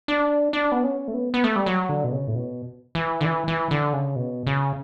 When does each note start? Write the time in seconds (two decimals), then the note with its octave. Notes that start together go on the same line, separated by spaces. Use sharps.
0.08 D4
0.53 D4
0.72 B3
0.84 C#4
1.08 A3
1.14 B3
1.34 B3
1.44 A3
1.56 G3
1.66 F#3
1.89 D3
2.04 B2
2.13 C#3
2.27 A2
2.35 B2
2.95 E3
3.21 D3
3.25 E3
3.48 E3
3.71 D3
3.93 C#3
4.16 B2
4.47 C#3